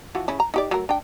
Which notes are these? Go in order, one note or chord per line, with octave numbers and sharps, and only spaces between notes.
E3 F3 F#4
C#3 C#4 E4
A#5
D#4 G4 D5
F#3 A3 A#4
D4 G5